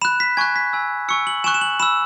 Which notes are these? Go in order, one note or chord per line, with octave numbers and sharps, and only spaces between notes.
B5 F#6 E7
B6
G#5 C#6 F#6 G#6
B6
G#5 E6
G#5 C#6 E6 C#7
F#7
G#5 C#6 F#6 E7
E7
F#7
B5 E6 E7